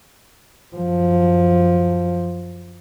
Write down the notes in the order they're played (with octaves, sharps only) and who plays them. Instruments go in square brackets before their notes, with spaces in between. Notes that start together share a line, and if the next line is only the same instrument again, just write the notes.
[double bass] F#2 F3